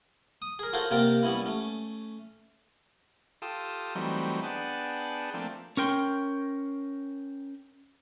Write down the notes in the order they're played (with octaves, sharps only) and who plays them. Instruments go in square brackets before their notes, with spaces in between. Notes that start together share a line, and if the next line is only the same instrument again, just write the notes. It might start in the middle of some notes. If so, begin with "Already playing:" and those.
[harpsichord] D#6
G#4 A#4
F4 F#4 A4 A#4 C5 C#5
C3 A#3 C4 G4 A#4 D5
G3 B3 C#4 E4
A3 C#4
[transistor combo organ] F4 G4 A4 D#6 E6
E3 F#3 G3 A3 C4 D#4
B3 D4 G#4 F#5 G5 A5
F3 A3 A#3 C4 D4
[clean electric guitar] C#4 A#4 G5 C6